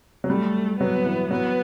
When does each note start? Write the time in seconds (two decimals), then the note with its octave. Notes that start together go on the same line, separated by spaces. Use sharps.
0.24 F#3
0.29 G3 A3
0.80 F#3 B3
1.05 E3
1.31 F#3 B3